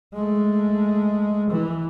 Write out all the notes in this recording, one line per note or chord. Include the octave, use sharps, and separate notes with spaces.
G#3 A3
E3